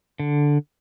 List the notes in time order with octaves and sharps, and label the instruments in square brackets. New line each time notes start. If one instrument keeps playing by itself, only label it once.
[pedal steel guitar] D3